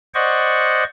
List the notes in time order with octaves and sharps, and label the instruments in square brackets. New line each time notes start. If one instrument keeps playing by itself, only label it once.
[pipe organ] C5 D5 D#5 F#5 C#6